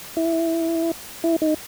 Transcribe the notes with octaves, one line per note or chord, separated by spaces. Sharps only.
E4
E4
D#4